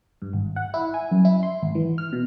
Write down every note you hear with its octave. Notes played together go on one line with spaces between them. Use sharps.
G2
G#1
F#5
E4
G#5
F#2
E4
C6
G#1
E3
F6
B2